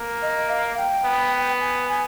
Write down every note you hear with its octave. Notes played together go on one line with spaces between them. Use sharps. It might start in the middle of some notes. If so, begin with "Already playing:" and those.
Already playing: A#3
D#5
F5
G5
B3
G#5
G#5